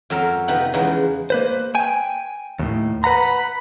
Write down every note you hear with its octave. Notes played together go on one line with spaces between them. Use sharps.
F2 F#3 A4 A#4
C3 D#3 F3 B3 D#4 B4
E2 C#3 G#3 B3 D#4
A#3 B4 C5
G5 G#5
D#2 A2
B4 F#5 A#5 B5